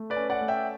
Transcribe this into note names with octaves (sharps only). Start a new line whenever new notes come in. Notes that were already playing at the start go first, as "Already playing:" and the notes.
Already playing: A3
B4 D5
C#4
D5 F#5
A3
E5 G5